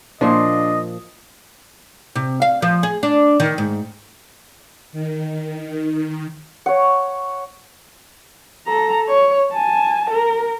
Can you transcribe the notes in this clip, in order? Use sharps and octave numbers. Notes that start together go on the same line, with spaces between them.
A#2 F3 D4 D#5 C6
C3
F5
F3
G#4
D4
D#3
G#2
D#3
C#5 F#5
A4 A#5
C#5
G#5 A5
A#4